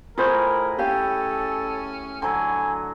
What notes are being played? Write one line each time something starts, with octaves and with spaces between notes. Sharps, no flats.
A2 F4 G#4 A#4 C5 C#5 B5
C#4 G4 A4 F5
D3 F#3 G#5